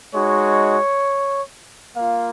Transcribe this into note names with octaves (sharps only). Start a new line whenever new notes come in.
G#3 D#4 F#4 C#5
A#3 F4 F5